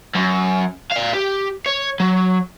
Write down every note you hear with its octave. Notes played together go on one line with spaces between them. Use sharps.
F#2
D5 F5
G4
C#5
F#3